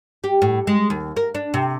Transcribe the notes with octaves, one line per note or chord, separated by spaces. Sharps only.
G4
A2
G#3
D#2
A#4
D4
C3